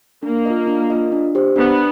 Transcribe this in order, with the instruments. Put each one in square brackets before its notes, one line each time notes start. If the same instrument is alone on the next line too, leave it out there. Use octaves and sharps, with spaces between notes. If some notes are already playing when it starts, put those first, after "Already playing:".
[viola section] A#3 [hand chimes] D4
[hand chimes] F4 A#4 D#5
D4
F4 A#4 D#5
D4
G4 C5
[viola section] B3 [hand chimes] D4